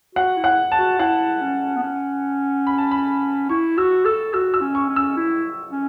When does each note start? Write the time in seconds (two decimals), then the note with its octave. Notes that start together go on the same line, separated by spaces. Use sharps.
0.15 F#4 F#5
0.37 E4
0.44 F#5
0.72 A5
0.78 F#4
0.99 E4 F#5
1.41 C#4
1.76 B3
1.83 C#4
2.67 B5
2.78 A5
2.91 B5
3.49 E4 C#6
3.78 F#4 E6
4.05 A4 E6
4.34 F#4 E6
4.54 E6
4.61 C#4
4.75 C#6
4.89 C#4
4.96 E6
5.17 E4
5.72 C#4